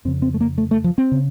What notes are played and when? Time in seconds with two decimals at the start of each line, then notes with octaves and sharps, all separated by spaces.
0.05 F2 C#3 C4
0.22 C4
0.34 A3
0.41 A#3
0.58 A3
0.71 A3
0.84 F3
0.98 C4
1.12 C#3